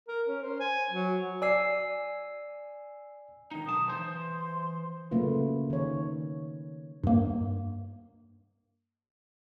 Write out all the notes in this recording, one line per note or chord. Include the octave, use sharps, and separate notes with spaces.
A#4
C#4
C5
G#5
F#3
D5 G#5 E6 C7
D#3 D#4 A#5
B1 A5 D#6
E3 C5 C6
C#3 F#3 A3 A#3 F4 B4
D#3 C#5
G2 A#3